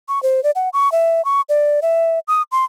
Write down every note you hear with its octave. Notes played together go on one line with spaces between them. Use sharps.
C#6
C5
D5
F#5
C#6
E5
C#6
D5
E5
D#6
C6